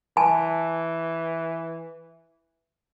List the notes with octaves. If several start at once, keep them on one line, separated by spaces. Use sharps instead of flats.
E3 G#5 A5